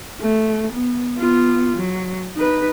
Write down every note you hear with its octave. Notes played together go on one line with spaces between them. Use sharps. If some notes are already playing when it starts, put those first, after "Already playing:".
A3
B3
B3 F4
F#3
D#4 B4